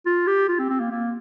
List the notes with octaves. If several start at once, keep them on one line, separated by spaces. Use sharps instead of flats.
F4
G4
F4
C4
C4
A#3
A#3